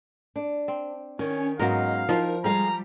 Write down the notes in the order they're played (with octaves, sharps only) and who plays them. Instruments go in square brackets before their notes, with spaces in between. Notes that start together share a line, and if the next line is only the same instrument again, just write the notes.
[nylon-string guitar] D4
[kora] C4
[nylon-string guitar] D#3 [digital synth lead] C#4 [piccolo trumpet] C#5
[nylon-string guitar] G#2 B3 C#4 [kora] F#3 A#4 [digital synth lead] D#5 [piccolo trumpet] F5
[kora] F3 [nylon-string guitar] D#4 [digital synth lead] A#4
[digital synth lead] G3 [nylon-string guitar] G#3 G#4 F5 [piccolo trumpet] A#5